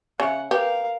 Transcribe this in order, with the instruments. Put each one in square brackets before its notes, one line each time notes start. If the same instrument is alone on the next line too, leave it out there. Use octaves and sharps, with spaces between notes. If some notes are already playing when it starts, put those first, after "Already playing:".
[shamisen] C#3 [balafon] E5 G#5 [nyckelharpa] F#5
[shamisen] G4 [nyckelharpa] A#4 F5 [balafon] B4